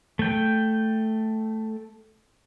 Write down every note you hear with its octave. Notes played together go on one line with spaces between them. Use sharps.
A3 G5